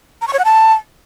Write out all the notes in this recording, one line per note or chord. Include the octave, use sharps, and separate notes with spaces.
A#5
C#6
C#5
F#5
A5